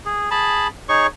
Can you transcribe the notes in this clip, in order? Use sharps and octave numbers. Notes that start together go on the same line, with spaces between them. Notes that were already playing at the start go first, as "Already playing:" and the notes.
G#4
G#4 A5 B5
D#4 G#4 C#5 C#6